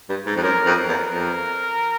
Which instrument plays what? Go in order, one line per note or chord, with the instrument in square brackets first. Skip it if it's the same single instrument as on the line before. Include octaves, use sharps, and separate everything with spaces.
[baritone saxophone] G2
G#2
F2
[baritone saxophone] F#2 [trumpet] A#4
[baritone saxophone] F2
[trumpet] A#4
[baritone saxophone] E2
F2